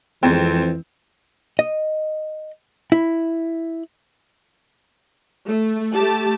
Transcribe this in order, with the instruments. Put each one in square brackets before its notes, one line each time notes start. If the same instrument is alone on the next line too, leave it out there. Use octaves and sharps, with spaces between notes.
[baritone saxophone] F2 [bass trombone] E3 [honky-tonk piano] G#3 C4
[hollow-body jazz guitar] D#5
E4
[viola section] A3
A3 G4 A5